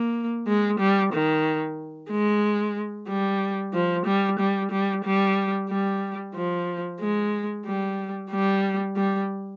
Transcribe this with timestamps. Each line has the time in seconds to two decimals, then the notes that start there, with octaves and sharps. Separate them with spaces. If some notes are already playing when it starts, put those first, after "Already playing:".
Already playing: A#3
0.47 G#3
0.80 G3
1.13 D#3
2.10 G#3
3.08 G3
3.73 F3
4.06 G3
4.39 G3
4.71 G3
5.05 G3
5.69 G3
6.34 F3
7.00 G#3
7.65 G3
8.31 G3
8.96 G3